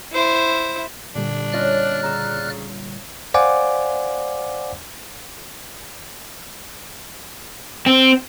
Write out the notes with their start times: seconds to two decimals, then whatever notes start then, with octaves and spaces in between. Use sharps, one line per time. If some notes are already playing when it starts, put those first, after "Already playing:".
0.12 E4 C5
1.15 A#2 D3 G3 D4
1.53 C#4 F4 D5 D#5 F6 F#6
2.03 C#3 A#5 E6
3.34 C5 D5 F5 F#5 G#5 D6
7.87 C4